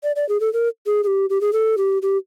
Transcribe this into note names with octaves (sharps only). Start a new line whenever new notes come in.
D5
D5
G#4
A4
A#4
G#4
G#4
G4
G4
G#4
A4
G4
G4